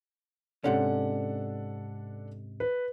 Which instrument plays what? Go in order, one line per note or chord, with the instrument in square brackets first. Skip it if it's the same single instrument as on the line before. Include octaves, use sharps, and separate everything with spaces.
[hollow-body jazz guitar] G#2 C3 C#4 [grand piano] D4 A4 F#5
[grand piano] B4